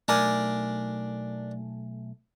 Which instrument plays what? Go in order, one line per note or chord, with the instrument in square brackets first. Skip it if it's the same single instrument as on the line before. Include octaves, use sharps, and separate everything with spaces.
[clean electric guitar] B1 A3 G#5 [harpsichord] D4 A#4 D5